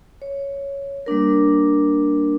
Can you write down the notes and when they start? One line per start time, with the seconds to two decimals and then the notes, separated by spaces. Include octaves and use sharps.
0.22 C#5
1.06 G3 A#3 D4 A#4